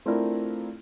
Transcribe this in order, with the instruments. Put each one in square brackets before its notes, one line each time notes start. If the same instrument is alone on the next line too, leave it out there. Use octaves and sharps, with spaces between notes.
[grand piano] A3 C4 D4 E4 F4 A#4